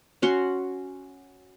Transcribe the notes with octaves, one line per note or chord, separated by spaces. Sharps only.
C#4 F#4 F#5 C6